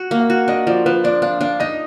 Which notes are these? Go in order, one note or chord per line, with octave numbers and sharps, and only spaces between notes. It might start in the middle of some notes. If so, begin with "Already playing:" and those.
Already playing: F#4
A#3
F5
F#4
D4 D#5
F3 D5
F3 B4
D4 D5
D4 F5
D4 F5
D#4 D#5